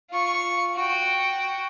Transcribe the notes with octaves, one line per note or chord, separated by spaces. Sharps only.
F4 C#6
F#4 G5